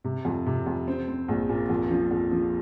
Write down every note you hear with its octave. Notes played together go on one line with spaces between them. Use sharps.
C3
F2
C3
F2
C4
C4
A#1
A#2
F2
F3
F2
F3